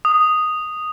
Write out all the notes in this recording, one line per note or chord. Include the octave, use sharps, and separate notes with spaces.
D#6